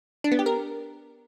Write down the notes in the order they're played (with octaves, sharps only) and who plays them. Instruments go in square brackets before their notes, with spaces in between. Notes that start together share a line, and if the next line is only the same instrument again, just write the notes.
[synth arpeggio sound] D4
B3
G4
A#4